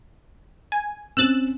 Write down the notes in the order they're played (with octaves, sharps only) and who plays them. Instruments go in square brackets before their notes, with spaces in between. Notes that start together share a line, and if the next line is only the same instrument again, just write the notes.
[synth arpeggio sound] G#5
[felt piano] C4 C#4 [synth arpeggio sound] E6 F#6 A6